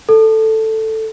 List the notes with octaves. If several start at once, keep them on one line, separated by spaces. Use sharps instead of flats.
A4